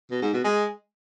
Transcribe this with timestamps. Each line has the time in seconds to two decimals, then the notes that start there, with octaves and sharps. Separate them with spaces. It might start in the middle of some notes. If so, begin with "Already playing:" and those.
0.11 B2
0.22 G#2
0.33 B2
0.45 G#3